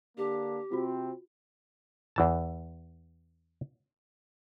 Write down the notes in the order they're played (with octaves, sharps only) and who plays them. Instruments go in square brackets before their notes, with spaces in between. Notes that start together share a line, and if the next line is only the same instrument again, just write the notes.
[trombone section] D3 A#3 D4 [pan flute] G4
[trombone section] C3 C4 [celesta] F4 F#4
[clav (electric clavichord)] E2 E3 A5